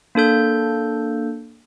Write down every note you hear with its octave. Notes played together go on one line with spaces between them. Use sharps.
A#3 D4 A4 G6